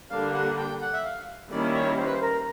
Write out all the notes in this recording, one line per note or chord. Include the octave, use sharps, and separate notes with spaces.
D3 G3 A#3 D4 F5
F#5
G5
F#5
E5
F5
D#3 G3 A#3 C#4 E4 D5
C#5
C5
B4
C5
A#4